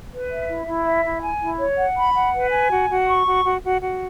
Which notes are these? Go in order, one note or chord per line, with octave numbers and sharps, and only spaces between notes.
B4
E5
E4
E4
E5
E4
G#5
E4
C#5
F#5
B5
F#5
B4
G#5
F#4
F#4
C#6
F#4
F#4
F#4
F#4